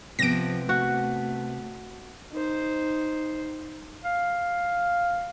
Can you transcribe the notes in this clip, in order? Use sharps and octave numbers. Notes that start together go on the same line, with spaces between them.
C3 F3 B3 A#6 D7
A3 F#4
D#4 C5
F5